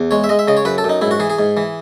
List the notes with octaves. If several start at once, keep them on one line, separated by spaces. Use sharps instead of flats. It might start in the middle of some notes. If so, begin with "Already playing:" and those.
Already playing: E2
G#3 C#5
E5
G#3 D#5
E5
C#3 D#5
C#5
F#2 B4
A4
F#2
D#4
G#2 E4
F#4
E3 G#4
G#4
G#2
E3